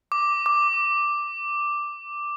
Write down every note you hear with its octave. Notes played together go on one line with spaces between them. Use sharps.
D6
D6